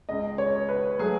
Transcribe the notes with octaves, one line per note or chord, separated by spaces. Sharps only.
C#2 C#3 G#3 D#5
C#5
B4
F#3 A3 G#4